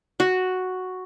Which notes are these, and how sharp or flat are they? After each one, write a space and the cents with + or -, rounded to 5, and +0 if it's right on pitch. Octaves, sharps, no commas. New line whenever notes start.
F#4 +0